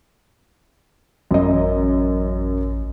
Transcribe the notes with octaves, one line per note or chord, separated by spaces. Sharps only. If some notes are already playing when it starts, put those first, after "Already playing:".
A1 F#2 D#5